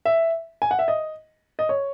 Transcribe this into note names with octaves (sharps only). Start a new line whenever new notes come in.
E5
G#5
F#5
E5
D#5
D#5
C#5